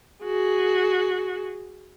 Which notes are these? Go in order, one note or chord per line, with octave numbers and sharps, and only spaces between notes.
F#4 G#4